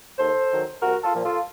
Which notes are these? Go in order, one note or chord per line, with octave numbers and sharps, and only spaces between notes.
D#2 A4 C5
D#3 F#3
C2 F#4 A#4
F4 A4
A#2 F3
F4 A4